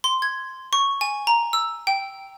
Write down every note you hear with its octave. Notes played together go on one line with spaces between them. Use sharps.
C6
G#6
C#6
G#5
A#5
E6
G5